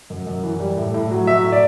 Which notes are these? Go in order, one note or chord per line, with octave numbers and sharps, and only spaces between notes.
F#2
F#2
E3
G3
A2
A2
F#3
F#3 E5
A2
D5